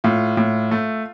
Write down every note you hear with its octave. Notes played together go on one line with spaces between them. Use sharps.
A2 F4
A2
A3